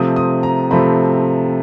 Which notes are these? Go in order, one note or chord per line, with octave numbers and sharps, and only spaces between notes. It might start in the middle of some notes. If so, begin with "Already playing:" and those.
Already playing: C3 F3 A3 C4 D#6
D#6
A#5
C3 F3 A3 C4 B5